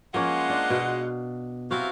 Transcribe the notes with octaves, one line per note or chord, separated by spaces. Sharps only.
F3 G#3 A#3 C#4 F4 F#5
D4
B2 F5
C3 C4 E4 F#4 F5